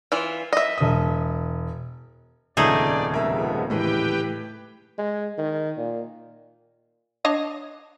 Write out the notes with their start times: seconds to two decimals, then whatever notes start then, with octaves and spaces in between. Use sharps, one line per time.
0.12 E3 E4 F4
0.53 D#5 E5
0.78 E1 D#6
2.57 D#1 F2 C#3 A3 D#4 G#4 D5 G6
3.12 F1 F3 G#3 B3 A#4 E5
3.70 A2 E3 G4 B4 G5
4.98 G#3
5.38 D#3
5.77 A#2
7.25 D4 C#5 D#5